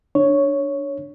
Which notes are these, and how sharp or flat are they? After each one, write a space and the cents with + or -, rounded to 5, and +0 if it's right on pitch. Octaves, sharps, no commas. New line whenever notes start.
D4 +0 C#5 +0